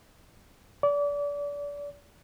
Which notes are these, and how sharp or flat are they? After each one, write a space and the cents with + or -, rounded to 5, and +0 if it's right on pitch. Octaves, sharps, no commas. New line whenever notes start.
D5 -30